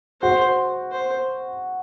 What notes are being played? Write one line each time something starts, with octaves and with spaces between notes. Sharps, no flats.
F#4 C5
C5